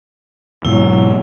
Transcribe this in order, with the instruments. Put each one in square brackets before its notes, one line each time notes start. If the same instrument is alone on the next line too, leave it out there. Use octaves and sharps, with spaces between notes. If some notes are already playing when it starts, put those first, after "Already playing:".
[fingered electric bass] G#2 B2 E3 [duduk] F#3 [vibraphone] E4